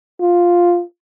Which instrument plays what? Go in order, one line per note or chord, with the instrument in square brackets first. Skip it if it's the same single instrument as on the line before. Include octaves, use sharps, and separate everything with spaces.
[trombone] F4